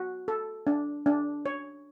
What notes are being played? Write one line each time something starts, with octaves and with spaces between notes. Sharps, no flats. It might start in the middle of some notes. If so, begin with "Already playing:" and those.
Already playing: F#4
A4
D4
D4
C#5